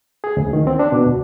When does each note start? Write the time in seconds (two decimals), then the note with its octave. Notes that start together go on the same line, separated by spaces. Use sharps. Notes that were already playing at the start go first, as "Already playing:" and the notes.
0.24 G#4
0.37 D2
0.53 D#3
0.67 C4
0.79 D4
0.92 B2
1.06 D2